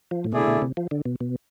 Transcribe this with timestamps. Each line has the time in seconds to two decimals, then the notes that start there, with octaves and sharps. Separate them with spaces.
0.11 F3
0.24 A2
0.33 B2 D3 A3 E4 G#4 D5
0.47 B2
0.62 C3
0.77 F3
0.91 D3
1.05 B2
1.20 B2